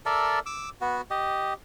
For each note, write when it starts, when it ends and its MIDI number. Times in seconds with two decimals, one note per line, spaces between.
0.06 0.39 69
0.06 0.39 70
0.06 0.39 74
0.06 0.39 76
0.46 0.69 86
0.46 0.69 88
0.81 1.01 59
0.81 1.01 66
1.10 1.54 67
1.10 1.54 75